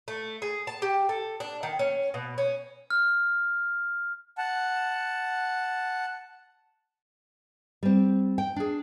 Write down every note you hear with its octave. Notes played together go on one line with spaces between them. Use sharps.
A3
G#4
A5
G4
A4
D4
D#3
C#4
B2
C#4
F6
F#5 A5
G3 C4
G5
D4 G#4